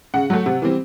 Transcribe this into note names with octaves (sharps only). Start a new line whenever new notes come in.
C#3 F#5
F#3 A3
C3
E3 G3 C4